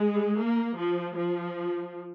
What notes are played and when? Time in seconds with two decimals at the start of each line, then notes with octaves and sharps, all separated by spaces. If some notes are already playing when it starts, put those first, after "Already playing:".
Already playing: G#3
0.38 A#3
0.76 F3
1.15 F3